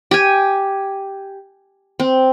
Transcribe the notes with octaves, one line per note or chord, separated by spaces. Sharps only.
G4 G#5
C4